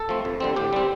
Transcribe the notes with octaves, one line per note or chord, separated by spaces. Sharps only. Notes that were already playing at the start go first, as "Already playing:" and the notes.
Already playing: A4
F3 A3 C4
F2
D3 G3 C4
A2 G4
G3 C4